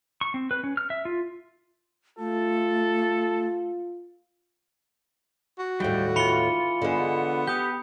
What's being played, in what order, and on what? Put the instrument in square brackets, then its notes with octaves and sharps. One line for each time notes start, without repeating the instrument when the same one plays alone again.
[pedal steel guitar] C#6
C4
B4
C#4
F6
E5
F4
[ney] A3 [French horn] F4 [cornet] A4
[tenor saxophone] F#4
[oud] D#2 A2 [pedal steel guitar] G3 G5
[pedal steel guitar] E3 F4 [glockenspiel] B5 C#7 G7
[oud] D3 G#3 [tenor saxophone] B3
[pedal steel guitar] G4 [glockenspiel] D#6 G6